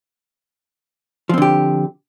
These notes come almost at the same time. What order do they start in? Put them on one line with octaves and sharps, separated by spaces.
F3 C4 D3 G4